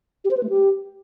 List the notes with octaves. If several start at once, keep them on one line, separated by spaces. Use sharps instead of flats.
G4
C5
B4
A3
G4